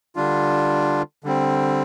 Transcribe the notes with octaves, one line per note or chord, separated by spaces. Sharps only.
D3 G3 D4 F4
D3 G3 C4